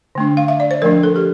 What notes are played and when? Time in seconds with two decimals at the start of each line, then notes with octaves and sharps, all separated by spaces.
0.15 D3 A3 D4
0.37 F5
0.48 E5
0.60 D5
0.71 C5
0.82 F3 A3 D4 A#4
1.03 A4
1.16 G4